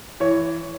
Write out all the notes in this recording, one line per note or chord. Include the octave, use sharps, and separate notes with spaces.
E3 C#5